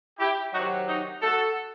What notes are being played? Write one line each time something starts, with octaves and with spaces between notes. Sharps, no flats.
E4 G4
C3 D#3 F#3 D#4 F#4
D#4 F#4
F#4 A4